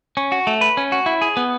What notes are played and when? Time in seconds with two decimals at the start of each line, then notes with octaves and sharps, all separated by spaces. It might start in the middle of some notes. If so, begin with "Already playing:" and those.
0.17 C#4
0.32 F#4
0.47 A3
0.61 B4
0.77 C#4
0.92 F#4
1.06 E4
1.22 G#4
1.37 B3